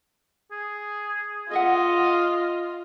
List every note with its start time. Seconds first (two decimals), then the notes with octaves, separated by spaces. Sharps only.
0.51 G#4
1.51 F4 G#4 D#5 E5 F#5